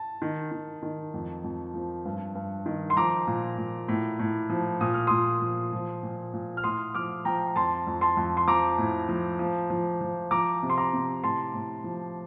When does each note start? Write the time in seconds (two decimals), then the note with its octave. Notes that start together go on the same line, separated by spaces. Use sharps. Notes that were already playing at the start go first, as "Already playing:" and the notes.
Already playing: A5
0.22 D#3
0.52 D#3
0.83 D#3
1.14 F2
1.44 F2
1.74 F3
2.05 G2
2.35 G2
2.66 D#3
2.90 C6
2.97 F3 A#5 D6
3.27 A#2
3.58 A#2
3.88 A2
4.19 A2
4.50 F3
4.81 A#2 D#6
4.94 F6
5.07 A#2 C6 D#6
5.42 F3
5.73 F3
6.03 A#2
6.33 A#2
6.57 F6
6.64 A2 C6 D#6
6.95 F3 D6 F6
7.25 F3 G5 A#5
7.56 F2 A5 C6
7.87 F2
8.01 A5 C6
8.17 F2
8.37 C6
8.48 F3 A#5 D6
8.78 A2
9.09 F3
9.39 F3
9.70 F3
10.01 F3
10.31 F3 A#5 D6
10.63 C3
10.70 C6
10.78 A#5 D6
10.93 C3
11.24 A2 A5 C6
11.54 A2
11.84 F3